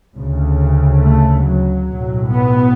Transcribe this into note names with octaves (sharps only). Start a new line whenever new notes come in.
D2 C#3
A3
F#3
B1 A2
B3